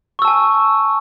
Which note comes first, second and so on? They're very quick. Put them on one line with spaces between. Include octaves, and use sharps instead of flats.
C#6 E6 A5 G#5